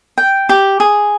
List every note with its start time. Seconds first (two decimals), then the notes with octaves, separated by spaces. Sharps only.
0.18 G5
0.49 G4
0.80 G#4